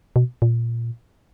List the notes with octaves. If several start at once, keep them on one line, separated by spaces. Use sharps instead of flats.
B2
A#2